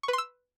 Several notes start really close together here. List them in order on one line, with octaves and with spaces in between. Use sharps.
C#6 B4 C6 E6